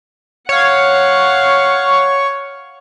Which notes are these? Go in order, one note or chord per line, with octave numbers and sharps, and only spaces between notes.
C#5 F5 F#5